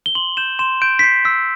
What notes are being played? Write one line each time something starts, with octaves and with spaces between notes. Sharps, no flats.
G7
C6 F#7
G6 E7
C6 E7
G6 D7
B6
G6 C7
E6 B6